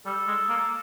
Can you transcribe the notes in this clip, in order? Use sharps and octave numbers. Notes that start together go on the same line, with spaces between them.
G3 A4
G#3
A#3